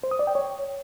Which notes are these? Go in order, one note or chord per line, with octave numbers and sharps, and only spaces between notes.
C5
D#6
D5
G5
C#5